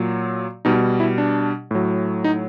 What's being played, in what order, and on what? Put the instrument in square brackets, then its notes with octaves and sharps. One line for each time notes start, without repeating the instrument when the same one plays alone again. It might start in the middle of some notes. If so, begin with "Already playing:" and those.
Already playing: [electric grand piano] A#2 F#3
B2 G3 D#4
E4
D4
A2 F#3
D#4